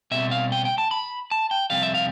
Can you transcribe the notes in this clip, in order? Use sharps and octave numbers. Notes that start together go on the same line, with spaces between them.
B2 G3 C4 E5
F5
G5
G5
A5
B5
A5
G5
F2 C3 G3 F5
E5
F5